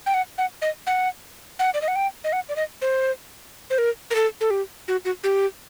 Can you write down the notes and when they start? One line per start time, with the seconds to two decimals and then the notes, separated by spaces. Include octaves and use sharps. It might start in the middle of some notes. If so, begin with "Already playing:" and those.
0.06 G5
0.14 F#5
0.38 F#5
0.62 D#5
0.87 F#5
1.59 F#5
1.74 D5
1.82 D#5
1.88 F#5
1.96 G5
2.24 D#5
2.33 F#5
2.49 D5
2.56 D#5
2.82 C5
3.70 C5
3.78 A#4
4.11 A#4
4.15 A4
4.41 A4
4.50 G4
4.88 F#4
5.05 F#4
5.24 G4